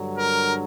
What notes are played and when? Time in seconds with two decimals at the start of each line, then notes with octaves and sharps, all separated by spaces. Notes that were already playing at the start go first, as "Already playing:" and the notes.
Already playing: G2 D3 F#3
0.16 A#4